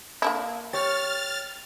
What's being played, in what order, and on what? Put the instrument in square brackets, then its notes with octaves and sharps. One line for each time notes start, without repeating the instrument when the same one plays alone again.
[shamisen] A#3 D4 E4
[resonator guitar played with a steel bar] G4 C#5 [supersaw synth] F6 A6